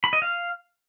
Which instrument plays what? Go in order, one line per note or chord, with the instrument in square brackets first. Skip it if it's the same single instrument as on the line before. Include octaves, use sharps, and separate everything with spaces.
[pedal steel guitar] B5
D#5
F5